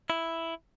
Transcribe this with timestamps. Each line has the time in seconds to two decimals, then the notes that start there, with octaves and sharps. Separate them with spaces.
0.10 E4